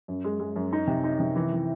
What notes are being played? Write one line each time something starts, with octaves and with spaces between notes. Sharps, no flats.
F#2
G#3
G#3
F#2
D#4
C3
D#4
C3
E3
E3